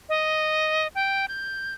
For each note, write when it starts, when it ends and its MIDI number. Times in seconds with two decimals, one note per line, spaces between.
0.09 0.88 75
0.95 1.26 79
1.28 1.74 91